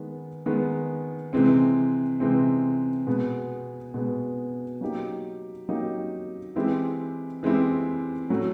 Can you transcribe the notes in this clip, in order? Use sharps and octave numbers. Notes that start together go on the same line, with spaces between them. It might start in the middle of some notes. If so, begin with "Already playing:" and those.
Already playing: D#3 G#3 B3
D#3 G#3 B3
C3 E3 G#3 C4
C3 E3 G#3 C4
B2 G#3 B3
B2 G#3 B3
F#3 A#3 D#4 G4
F#3 A#3 D#4 G4
E3 G#3 C4 E4 G4
E3 G#3 C4 E4 G4
A2 F#3 A3